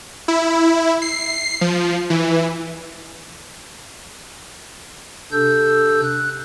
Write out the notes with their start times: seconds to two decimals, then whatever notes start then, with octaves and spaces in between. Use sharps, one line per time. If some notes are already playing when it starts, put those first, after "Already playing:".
0.28 E4
1.02 C7
1.61 F3
2.10 E3
5.32 C3 D4 A4 E6 G6
6.02 F#6